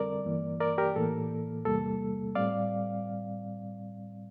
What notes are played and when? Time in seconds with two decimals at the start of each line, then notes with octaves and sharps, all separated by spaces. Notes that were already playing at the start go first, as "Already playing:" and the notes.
Already playing: F2 D3 G3 C4 A4 A#4 D5
0.26 G2 E3 A#3
0.60 A#4 D5
0.78 G4 A#4
0.96 A2 E3 A#3 A4
1.65 E2 C3 G3 A#3 A4
2.35 A2 G3 C4 D5 F5